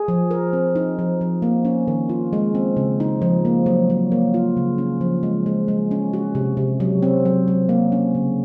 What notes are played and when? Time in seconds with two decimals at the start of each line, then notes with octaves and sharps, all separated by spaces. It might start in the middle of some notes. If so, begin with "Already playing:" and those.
Already playing: G#4
0.08 F3
0.31 A#4
0.53 C4
0.76 D#4
0.99 F3
1.21 F3
1.42 A#3
1.65 C#4
1.88 D#3
2.09 F4
2.33 G#3
2.55 C4
2.77 C#3
3.00 D#4
3.22 F3
3.45 A#3
3.66 F#3
3.90 F#3
4.12 A#3
4.34 F4
4.57 C#3
4.78 C#4
5.01 F3
5.23 G#3
5.46 G#3
5.68 G#3
5.91 C#4
6.13 F#4
6.35 C3
6.57 C3
6.80 F#3
7.03 C4
7.25 F#3
7.48 F#3
7.69 A#3
7.92 C#4
8.15 C#3